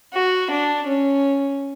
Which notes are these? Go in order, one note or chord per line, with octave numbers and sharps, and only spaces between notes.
F#4
D4
C#4